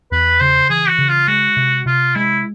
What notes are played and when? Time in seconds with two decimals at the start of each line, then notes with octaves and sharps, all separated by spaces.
0.12 E2 B4
0.40 C#3 C5
0.70 E3 G#4
0.89 F#4
0.98 C#3
1.09 F4
1.27 G#3 F#4
1.57 C3
1.86 C3 F4
2.15 G#3 E4